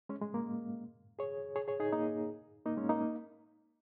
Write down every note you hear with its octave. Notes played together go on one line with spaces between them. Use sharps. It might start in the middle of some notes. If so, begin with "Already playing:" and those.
G#3 C#4
G#3
A#3
G#4 C#5
G#4 C#5
G#4 C#5
D#4 G#4
A#3 D#4
A#3 D#4
G#3 C#4
A#3 D#4